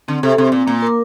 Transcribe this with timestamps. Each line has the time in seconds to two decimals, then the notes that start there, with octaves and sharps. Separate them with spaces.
0.08 D3 C4
0.23 C3 A4
0.38 C3 C4
0.52 A#2 C4
0.67 A#2 A#3
0.82 A#4